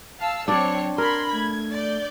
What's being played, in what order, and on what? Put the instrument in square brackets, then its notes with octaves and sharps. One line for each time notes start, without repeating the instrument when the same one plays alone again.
[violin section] F5 A5 E6
[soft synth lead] F#3 [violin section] C4 C#5 [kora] D4 D5
[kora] A#4 [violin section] B5 C6 [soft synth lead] G#6
[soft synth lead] A3 [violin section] G#6
[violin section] D5 G6